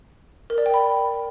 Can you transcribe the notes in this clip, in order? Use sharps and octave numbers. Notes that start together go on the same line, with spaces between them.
A#4
D5
G5
B5